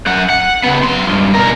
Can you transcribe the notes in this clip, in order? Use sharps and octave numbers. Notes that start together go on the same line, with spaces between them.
F#2 F#5
F#5
C#3 B3
F#2 C6
C#2 G2
B2 A#4